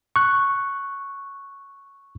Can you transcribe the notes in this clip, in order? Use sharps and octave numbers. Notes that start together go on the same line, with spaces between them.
C#6 F#6